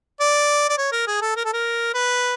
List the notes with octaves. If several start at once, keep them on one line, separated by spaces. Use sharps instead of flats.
D5
D5
C#5
A#4
G#4
A4
A#4
A4
A#4
B4